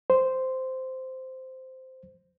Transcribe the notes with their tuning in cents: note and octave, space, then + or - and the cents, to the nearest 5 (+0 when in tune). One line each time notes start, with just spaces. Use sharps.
C5 -10